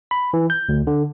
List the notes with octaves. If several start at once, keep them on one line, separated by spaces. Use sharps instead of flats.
B5
E3
G6
D2
D3